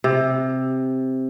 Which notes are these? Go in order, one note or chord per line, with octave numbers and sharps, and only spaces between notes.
C3